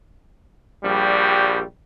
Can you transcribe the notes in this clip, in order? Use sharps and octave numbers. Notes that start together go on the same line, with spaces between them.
A#1 G3